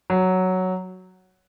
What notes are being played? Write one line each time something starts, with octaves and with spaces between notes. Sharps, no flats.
F#3